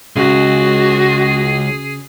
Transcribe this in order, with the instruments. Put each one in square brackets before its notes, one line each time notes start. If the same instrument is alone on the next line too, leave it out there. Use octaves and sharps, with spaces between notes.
[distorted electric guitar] C#2 [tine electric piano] C#3 [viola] F#4 [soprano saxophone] G#4